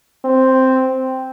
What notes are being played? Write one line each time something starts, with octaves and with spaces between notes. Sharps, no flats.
C4